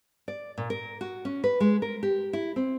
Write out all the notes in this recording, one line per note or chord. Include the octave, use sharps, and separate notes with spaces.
D5
A#2
A#4
F#4
C#4
B4
G#3
A#4
G4
E4
C4